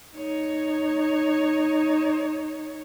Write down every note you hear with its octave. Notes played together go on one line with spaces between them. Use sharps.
D#4 C#5